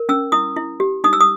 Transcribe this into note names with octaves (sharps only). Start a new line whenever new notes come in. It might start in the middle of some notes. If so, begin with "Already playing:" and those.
Already playing: A#4
C#4 E6
E4 D#6
E4
G4
D#4 D#6
E6
D#6